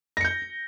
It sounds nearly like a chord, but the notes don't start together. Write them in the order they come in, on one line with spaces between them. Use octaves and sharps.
A#6 C#7 G6